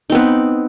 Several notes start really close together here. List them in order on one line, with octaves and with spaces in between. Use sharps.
D#4 C4 B3